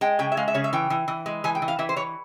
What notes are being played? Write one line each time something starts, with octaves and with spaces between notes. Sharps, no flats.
G#3 G5
C#3 G5
E5
G#3 F5
E5
C#3 C#5
E5
E3 G5
E3
E3
G#3
E3 G#5
G5
E3
F5
E3 E5
C5
E3 C#5